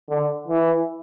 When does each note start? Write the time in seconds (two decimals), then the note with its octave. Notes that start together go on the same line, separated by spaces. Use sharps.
0.09 D3
0.48 E3